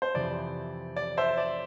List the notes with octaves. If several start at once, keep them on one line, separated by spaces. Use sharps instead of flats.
C5
F2 C3 E3 D5
D5
C5 E5
D5